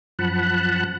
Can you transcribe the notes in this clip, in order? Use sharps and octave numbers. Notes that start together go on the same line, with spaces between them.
F#2 F3 F#5 A5 B5 F#6